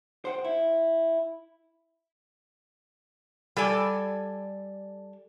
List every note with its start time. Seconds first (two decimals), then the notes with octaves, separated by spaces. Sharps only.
0.25 C5 F#5 G5
0.44 E4
3.56 G3 A4 D5 G#5